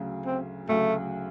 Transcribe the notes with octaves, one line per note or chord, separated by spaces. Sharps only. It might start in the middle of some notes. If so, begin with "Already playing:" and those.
Already playing: D2 C#3 F#3
C4
D2 C#3 F#3 A3